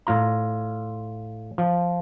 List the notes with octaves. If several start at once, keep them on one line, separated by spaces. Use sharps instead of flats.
A2 F4 A#5
F3